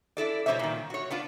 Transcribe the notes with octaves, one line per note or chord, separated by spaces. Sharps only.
D4 E4 A4 D5
B2 G3 D4 C5 C#5 E5
A#2 D#3
F#4 C#5
B3 D4 F4